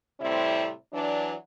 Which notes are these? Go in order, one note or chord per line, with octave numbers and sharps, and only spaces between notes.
A2 C3 G3 C4 E4
E3 F#3 D4